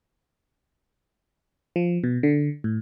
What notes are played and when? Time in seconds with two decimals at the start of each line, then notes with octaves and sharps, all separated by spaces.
1.76 F3
2.04 B2
2.23 D3
2.64 A2